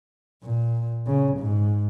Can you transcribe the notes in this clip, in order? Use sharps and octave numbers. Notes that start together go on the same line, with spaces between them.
A#2
C#3
G#2